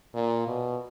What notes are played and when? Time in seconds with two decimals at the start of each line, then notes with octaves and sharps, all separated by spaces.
0.14 A#2
0.47 B2